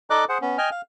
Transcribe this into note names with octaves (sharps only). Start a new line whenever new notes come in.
D#4 A4 D5 D#5 D6 F#6
G#4 C5 F#5
B3 C#4
D#5 G5 G#5 F6
F5